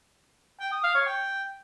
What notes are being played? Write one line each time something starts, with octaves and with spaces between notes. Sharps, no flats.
G5
D#6
F5
C#5
G5